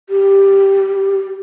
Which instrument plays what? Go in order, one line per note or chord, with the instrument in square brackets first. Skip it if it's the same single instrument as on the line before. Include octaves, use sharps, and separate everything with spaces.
[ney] G4